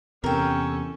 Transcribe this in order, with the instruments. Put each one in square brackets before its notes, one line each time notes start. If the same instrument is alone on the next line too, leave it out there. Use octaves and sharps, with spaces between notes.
[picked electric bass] E2 C3 [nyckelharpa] C#4 A4 [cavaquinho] A#4 G5